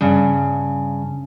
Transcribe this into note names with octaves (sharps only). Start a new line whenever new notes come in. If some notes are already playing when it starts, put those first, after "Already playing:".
G2 C#3